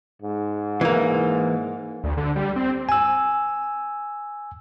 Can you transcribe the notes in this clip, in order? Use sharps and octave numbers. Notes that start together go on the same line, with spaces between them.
G#2
E3 A#3
D2
D3
G3
C4
G#5 E6